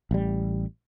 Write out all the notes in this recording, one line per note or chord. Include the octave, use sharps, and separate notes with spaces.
A1 G3